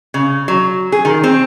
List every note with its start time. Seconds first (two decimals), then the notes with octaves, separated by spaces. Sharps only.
0.14 C#3
0.48 F#3
0.92 G#4
1.05 D#3
1.24 C4